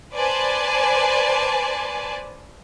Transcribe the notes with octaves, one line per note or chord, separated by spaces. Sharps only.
B4 C5 D5 G#5 A5